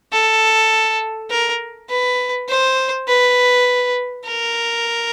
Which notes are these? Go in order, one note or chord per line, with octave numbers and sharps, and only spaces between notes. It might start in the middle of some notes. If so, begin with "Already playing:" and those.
A4
A#4
B4
C5
B4
A#4